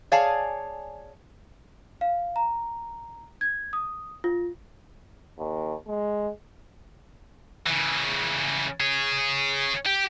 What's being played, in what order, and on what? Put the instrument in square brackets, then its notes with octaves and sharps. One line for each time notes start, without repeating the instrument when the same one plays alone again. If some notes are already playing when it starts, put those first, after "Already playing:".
[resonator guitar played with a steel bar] G#4 C#5 D5 F5 G#5 A5
[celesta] F5
A#5
G#6
D#6
F4
[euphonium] D#2
G#3
[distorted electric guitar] C#3 E3
G#4 C#5
G4